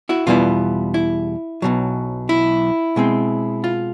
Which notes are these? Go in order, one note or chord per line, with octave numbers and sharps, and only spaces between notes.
E4 F#4
E2 B2 G3 B3 E4 F4
E4
B1 B2 F#3
E4
B2 G#3 C4
F4